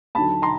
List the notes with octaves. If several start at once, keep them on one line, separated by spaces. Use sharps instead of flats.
D#2 D3 F#3 A5 B5
A#5 C6